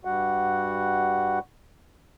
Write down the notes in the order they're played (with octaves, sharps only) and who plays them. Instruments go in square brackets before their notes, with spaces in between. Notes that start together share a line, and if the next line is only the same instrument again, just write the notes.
[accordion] G2 G3 F#4 F#5